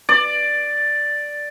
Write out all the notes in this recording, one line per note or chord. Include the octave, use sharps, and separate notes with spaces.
D5